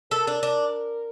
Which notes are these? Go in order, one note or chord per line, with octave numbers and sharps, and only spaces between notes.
A4 A#4
D4
D4